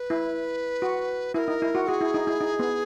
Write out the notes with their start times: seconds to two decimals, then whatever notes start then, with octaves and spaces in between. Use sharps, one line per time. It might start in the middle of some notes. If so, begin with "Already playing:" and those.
Already playing: B4
0.10 E4
0.82 F#4
1.34 E4 B4
1.38 A#4
1.48 D#4
1.62 E4
1.75 F#4
1.88 F#4 G#4
2.01 E4
2.14 D#4
2.27 E4
2.41 D#4
2.59 B3